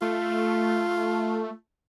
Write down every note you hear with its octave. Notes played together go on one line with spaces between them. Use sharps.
A3 F4